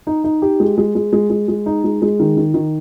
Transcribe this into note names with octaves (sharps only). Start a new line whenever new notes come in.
D#4
D#4
G4
G#3
G#3
G#3
G#3
G#3
G#3
D#4
G#3
G#3
D#3
D#3
D#3